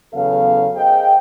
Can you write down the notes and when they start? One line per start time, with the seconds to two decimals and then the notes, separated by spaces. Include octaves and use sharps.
0.13 E2 C#3 F#3 B3 A4 F5
0.76 G#4 A#4 C5 D#5 F5 G5